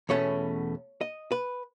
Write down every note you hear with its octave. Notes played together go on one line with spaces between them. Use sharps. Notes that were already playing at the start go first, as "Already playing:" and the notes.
E2 B2 A3 C#4 C#5
D#5
B4